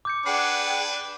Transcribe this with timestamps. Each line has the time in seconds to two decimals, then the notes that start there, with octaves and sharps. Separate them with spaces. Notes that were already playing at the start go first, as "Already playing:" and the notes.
0.05 D6 G6 C#7
0.26 D4 G#4 B4 F#5 G5 C7